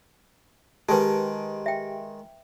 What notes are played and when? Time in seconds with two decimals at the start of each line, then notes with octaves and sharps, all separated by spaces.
0.89 D#3 G#3 G4 B4 A5
1.66 E5 G5